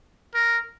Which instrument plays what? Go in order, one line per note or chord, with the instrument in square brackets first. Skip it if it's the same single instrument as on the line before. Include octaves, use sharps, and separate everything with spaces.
[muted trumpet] A#4